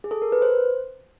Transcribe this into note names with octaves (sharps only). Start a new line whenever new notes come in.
G#4
A4
A#4
B4
C5